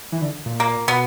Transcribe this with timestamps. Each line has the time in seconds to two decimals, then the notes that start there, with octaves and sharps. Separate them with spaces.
0.12 E3
0.22 D3
0.46 A#2
0.60 A#3
0.88 B2 B3